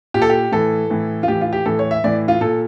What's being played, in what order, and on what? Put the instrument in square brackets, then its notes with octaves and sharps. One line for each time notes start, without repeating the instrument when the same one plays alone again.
[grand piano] A#2 G4
A4
G4
A2 E3 A4
A2 E3
F4
A2 E3 G4
F4
G4
A2 E3 A4
C#5
E5
A2 E3 D5
F4
A#2 A4